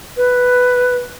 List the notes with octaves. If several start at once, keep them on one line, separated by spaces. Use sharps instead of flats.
B4